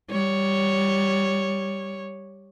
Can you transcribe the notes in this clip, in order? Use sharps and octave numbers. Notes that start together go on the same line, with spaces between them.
G3 C#5